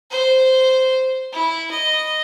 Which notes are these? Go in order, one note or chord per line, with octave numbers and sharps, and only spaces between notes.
C5
E4
D#5